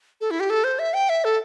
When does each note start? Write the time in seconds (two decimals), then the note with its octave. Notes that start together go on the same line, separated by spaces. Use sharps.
0.21 A4
0.31 E4
0.40 G4
0.50 A4
0.64 C5
0.79 E5
0.94 G5
1.09 E5
1.24 A4